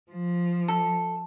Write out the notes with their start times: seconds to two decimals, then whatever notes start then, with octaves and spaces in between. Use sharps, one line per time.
0.12 F3
0.68 A4